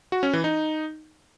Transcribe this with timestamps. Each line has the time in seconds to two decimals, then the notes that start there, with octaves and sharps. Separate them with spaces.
0.12 F#4
0.23 C#4
0.33 E3
0.44 D#4